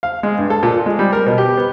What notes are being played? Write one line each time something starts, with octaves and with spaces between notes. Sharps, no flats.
F5
G#3
G2
A4
A#2
F4
G#3
G3
A#4
B2
G4
B3